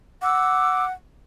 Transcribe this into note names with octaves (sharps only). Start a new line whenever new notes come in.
F#5 D6 E6